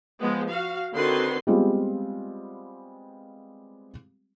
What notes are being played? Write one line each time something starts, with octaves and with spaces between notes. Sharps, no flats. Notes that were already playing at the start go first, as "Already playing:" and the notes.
F3 G#3 B3
F#4 F5
D3 D#3 C4 F#4 B4 C6
G3 G#3 B3 C4 F4